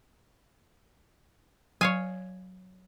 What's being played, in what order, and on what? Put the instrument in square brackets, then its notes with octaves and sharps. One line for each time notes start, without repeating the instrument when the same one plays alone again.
[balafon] F#3 [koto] C#5 F5 G#5